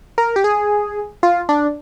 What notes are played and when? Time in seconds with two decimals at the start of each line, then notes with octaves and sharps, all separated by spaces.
0.18 A#4
0.36 G4
0.44 G#4
1.23 F4
1.49 D4